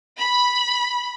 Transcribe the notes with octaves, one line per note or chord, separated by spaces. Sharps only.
B5